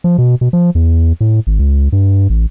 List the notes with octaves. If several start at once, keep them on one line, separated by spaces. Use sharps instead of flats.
F3
B2
B2
F3
E2
A2
G#1
C#2
G2
A1